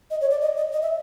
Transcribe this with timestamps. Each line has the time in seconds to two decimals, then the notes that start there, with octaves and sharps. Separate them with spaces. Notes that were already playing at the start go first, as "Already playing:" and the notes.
0.11 D#5
0.21 C#5
0.31 D5
0.41 D#5
0.57 D#5
0.72 D#5
0.82 E5